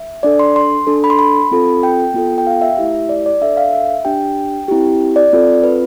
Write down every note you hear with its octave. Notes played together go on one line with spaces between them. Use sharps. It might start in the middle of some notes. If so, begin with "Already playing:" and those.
Already playing: E5
D4 A4 D5
C6
C6
D4 A4
B5
C6
B5
C4 F4 A4
G5
B3 F4 A4
G5
F5
E5
A3 E4 G4
D5
D5
D4 A4 E5
F5
E5
D4 G4 G5
C4 E4 G4
D5
C4 F4 A4
B4